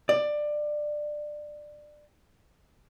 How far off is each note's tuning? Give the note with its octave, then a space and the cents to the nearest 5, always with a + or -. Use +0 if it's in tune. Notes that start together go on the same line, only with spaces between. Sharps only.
D5 +20